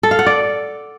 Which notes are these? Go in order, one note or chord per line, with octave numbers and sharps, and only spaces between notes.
A4
F5
F#5
D5